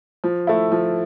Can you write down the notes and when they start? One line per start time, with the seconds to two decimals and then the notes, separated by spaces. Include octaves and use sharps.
0.24 F3
0.47 A3 E4
0.72 F3